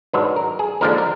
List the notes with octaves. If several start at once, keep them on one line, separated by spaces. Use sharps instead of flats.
G#2 D#3 F#3 D4 B4
A#4
G#4
D#2 D3 F3 G#3 D4 A#4
A#4